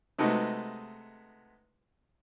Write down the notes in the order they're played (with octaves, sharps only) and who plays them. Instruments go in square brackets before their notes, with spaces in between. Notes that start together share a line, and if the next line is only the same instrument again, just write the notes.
[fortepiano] C3 G#3 A3 B3 D#4 F#4